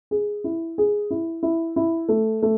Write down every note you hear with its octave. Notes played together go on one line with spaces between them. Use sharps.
G#4
E4
G#4
E4
E4
E4
A3
A3